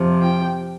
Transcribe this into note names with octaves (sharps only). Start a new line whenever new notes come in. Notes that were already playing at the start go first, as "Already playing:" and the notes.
Already playing: F2 C3 F3
G5